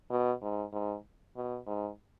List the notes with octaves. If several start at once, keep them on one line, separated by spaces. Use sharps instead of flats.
B2
G#2
G#2
B2
G#2